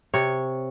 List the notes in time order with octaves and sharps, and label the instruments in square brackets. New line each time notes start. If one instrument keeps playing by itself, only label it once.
[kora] C3 C#5